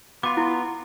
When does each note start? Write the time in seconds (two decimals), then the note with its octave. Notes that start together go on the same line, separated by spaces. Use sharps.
0.23 B3 F4 C6 D6
0.37 E4